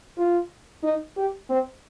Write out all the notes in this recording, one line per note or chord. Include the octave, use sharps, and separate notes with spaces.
F4
D#4
G4
C4